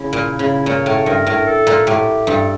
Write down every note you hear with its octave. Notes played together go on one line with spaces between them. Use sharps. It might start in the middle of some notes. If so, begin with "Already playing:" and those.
Already playing: C#3 E4
A#2
C#3
A#2 C#5
A2
G2 A#4
A2
A4
A#2
A2 G4
G2 A4